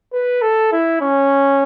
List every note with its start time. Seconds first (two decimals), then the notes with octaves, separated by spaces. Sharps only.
0.13 B4
0.42 A4
0.72 E4
1.01 C#4